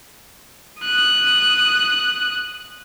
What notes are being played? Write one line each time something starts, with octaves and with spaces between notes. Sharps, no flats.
D#6 F#6